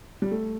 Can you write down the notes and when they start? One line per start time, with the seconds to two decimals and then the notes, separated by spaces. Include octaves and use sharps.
0.22 G3
0.31 A3